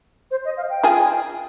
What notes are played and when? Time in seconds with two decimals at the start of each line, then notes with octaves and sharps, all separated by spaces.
0.31 C5
0.45 D#5
0.57 F5
0.70 G5
0.84 F4 G#4